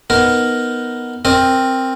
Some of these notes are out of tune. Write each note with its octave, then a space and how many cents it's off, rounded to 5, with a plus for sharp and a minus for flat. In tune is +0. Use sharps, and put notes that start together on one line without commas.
B3 +0 D#4 +0 A#4 +0
C4 +5 A#4 +0 D#5 -30